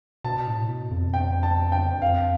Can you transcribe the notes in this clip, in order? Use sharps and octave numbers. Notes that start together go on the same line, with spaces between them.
B2 A5
A2
B2
F2
G5
A5
G5
F2 F5